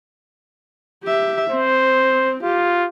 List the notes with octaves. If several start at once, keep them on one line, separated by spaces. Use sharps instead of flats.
G4 E5
C4 C5
F4 G4